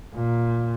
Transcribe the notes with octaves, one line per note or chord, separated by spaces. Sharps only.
A#2